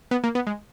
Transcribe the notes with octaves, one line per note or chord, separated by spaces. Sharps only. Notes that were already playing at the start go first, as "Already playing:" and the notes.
B3
A#3
B3
G#3